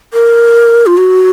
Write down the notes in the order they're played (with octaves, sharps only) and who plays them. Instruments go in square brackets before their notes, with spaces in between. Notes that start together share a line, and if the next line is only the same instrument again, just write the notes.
[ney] A#4
F4
F#4